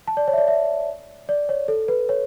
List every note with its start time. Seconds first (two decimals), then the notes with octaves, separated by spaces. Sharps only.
0.08 A5
0.17 D5
0.28 C#5
0.33 E5
0.38 D5
0.48 E5
1.29 D5
1.49 C#5
1.68 A4
1.88 B4
2.09 C#5